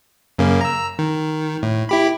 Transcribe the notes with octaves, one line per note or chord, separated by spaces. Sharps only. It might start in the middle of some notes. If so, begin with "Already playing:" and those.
F#2 C#3 A#3
A#5 E6
D#3
A2
E4 G4 B5